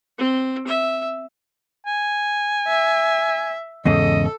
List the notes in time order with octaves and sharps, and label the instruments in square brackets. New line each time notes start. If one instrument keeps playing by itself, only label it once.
[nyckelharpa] C4
E5
[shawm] G#5
[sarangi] E5
[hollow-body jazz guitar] E2 G#2 C#3 [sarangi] A4 [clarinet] D#5